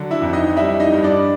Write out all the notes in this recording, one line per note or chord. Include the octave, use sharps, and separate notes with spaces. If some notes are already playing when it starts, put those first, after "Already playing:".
Already playing: D3 F#3
E4 E5
F2
D#4 D#5
G3 E4 E5
D#4 D#5
G2
D4 D5